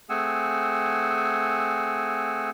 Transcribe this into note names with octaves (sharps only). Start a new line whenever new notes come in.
A3 C4 G#4 F#5 G#5 E6